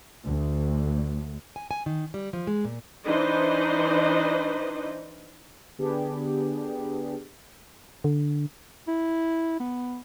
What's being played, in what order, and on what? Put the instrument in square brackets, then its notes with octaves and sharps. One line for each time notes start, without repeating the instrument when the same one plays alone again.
[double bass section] D2
[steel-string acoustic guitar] G#5
G#5
D#3
G3
F3
G#3
A#2
[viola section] E3 D4 D#4 B4 C5 D#5
[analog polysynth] D3 B3 D4 G4 G#4
[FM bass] D3
[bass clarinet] E4
B3